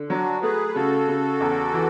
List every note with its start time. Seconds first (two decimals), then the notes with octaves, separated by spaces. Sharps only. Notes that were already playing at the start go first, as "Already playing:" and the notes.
Already playing: D3
0.09 F#3 D4 F#4
0.42 A3 G#4 B4
0.68 B4
0.75 C#3 F#4 A4
1.08 C#3
1.40 E2
1.74 E3